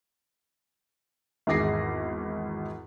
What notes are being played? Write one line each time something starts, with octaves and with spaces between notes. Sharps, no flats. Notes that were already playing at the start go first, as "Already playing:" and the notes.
G#1 E2 G#4 D6 A#6 C7